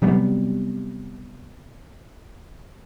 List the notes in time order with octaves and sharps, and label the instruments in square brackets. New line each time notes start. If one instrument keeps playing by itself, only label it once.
[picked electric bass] C3 F#3 G3 B3